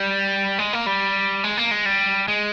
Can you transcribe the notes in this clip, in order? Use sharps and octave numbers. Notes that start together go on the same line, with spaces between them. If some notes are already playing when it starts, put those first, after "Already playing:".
Already playing: G3
G#3
A#3
G3
G#3
A#3
G#3
G3
G#3